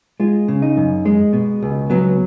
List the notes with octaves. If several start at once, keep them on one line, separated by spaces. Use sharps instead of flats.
G#3 F4
C#3
D#4
F#2
G#3
B2
C#2
F#3 B3